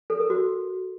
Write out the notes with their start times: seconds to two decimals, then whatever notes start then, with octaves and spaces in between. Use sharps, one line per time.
0.10 A4
0.20 A#4
0.30 F#4